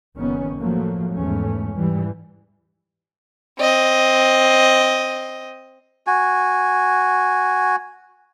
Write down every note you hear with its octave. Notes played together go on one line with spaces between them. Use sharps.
F#1 D#3 B3 C#4
A2 F3 F#3 A3 A#3
E2 G#2 E3 A3 C#4
G#2 E3 G3
C4 D#5
F#4 G#5